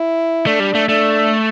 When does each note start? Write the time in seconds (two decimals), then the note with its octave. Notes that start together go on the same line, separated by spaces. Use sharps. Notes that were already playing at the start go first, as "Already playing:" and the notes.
Already playing: E4
0.47 A3 D4
0.60 G3
0.75 A3
0.89 A3 D4